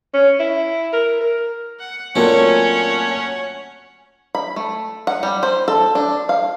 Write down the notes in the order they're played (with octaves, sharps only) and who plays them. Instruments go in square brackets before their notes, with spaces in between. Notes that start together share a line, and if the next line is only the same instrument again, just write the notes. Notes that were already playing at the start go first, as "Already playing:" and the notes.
[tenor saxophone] C#4
E4
A#4
A#4
[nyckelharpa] F#5
[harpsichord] A#2 C4 [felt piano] F#3 A3 A#3 [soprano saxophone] C#4 [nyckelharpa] C#5 F#5
[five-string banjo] B5
A3
F#5
G3
C5
A4
D4
F5